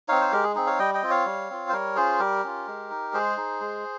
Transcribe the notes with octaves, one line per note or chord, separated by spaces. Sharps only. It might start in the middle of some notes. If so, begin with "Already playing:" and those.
C4 D#4 C#5 F5
C5
G#3 G4 A#4
G#4
C4 D#4 G#4
C#5 F5
G3 D#5 G5
D#5 G5
C4 F4
C#5 F5
G3
C4 F4
C5
G3 A#4 C#5
C#4 F4 G#4 C5
G3 G4 A#4
C#4 F4
G#3
D#4
G#3 G#4 C5
D#4
G#3